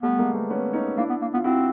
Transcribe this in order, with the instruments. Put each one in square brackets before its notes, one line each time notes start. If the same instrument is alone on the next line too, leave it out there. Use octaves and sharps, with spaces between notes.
[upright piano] G3 A3 [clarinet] B3
[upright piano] G#3 A#3
A3 B3
B3 C#4
C#4 D#4
[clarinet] A#3 [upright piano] D4 E4
[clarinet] B3
A#3
[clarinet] B3 [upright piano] F4
[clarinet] C4 [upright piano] E4 F#4